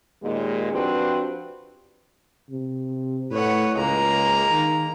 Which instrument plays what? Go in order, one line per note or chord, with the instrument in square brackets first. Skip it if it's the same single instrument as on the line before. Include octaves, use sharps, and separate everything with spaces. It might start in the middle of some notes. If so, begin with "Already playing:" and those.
[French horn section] D#2 A#2 G#3
F3 C4 D4 F#4 G4 B4
[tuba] C3
[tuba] A2 [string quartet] B4 C#5 F#5
[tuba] C#2 [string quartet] G#3 A#3 A#5
[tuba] D#3